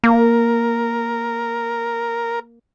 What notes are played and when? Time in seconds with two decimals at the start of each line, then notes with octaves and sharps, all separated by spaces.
0.04 A#3 A#4